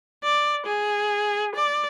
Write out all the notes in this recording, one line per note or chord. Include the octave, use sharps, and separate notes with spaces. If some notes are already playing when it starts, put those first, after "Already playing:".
D5
G#4
D5